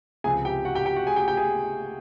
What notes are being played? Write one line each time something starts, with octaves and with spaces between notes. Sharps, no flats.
C#2 C3 F3 G#4 G#5
G4 G5
F#4 F#5
G4 G5
G4 G5
F#4 F#5
G#4 G#5
G4 G5
G4 G5
G#4 G#5